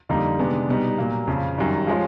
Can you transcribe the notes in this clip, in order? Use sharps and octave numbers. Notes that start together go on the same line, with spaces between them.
F2 D3 G3 A#3 D#4
C3 D#3 G#3 B3 D4
B2 G3 B3 D#4
A#2 F#3 A#3
F2 C#3 F3
F#2 D#3 G3
F3 G#3 C#4 F4